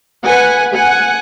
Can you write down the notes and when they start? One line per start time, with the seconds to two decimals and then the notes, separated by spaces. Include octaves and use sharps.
0.25 B4 F#5 G#5
0.71 F#5 G#5